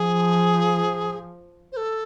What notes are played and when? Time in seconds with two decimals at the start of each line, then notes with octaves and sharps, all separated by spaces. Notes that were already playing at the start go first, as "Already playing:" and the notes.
Already playing: F3 G#4
1.72 C5
1.77 A4